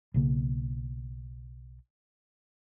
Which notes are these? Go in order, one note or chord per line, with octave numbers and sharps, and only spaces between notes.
B1 C#3 A#3